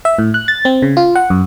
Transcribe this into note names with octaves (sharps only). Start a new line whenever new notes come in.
E5
A2
F#6
A6
C4
C#3
F4
F#5
F#2